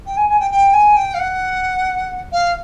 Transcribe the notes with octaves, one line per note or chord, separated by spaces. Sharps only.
G5
G#5
G#5
G5
G5
G#5
G5
F5
F#5
F5